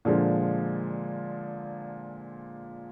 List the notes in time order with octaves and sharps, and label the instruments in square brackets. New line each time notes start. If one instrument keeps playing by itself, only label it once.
[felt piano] A#2 D3 F3 G#3